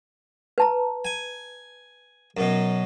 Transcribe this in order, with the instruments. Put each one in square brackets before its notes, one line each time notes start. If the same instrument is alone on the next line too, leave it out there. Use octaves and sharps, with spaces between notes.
[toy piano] B4 A5 A#5
[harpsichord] G#5
F#2 B2